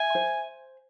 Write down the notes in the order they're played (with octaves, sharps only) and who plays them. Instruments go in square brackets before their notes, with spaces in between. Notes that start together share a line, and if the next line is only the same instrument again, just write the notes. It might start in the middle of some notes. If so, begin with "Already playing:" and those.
Already playing: [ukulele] E5 [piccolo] G#5
[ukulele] C5